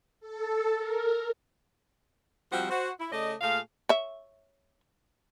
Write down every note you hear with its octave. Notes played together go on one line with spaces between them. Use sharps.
A4
A#4
F3 G3 C4 F4 F#4 F#5
F#4 C5
E4
C#3 A3 D5 D#5
A#2 A3 G#4 F5
C#5 E5